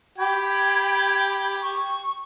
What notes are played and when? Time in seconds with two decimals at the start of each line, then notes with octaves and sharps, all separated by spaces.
0.18 G4 G5 B5 G#6
1.61 C#6